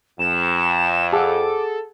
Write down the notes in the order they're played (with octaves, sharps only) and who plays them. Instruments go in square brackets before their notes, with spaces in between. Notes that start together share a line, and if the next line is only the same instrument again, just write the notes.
[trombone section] F2 [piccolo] E7
[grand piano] G#4 F#5 [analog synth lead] A4 [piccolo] D6